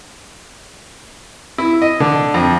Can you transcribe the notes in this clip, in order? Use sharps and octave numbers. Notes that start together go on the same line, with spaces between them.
E4
D#5
D3
F2